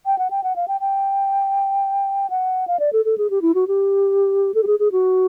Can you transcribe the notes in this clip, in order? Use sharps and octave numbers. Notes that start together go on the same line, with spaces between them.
G5
F#5
G5
F#5
F5
G5
G5
F#5
F5
D5
A4
A4
G#4
G4
E4
F#4
G4
A4
G4
G#4
G#4
F#4